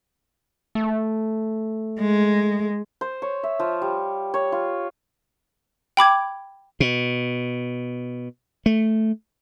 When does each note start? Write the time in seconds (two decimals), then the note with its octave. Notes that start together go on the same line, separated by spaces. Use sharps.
0.75 A3
2.00 G#3
3.01 C5
3.22 C#5
3.43 E5
3.60 F3
3.82 G3
4.34 C#5
4.52 F4
5.97 G5 B5 D6 G#6
6.80 B2
8.66 A3